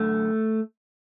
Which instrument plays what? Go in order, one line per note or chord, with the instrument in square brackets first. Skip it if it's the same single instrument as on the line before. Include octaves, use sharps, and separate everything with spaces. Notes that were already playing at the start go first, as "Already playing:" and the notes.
Already playing: [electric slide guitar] F#2 D3 A3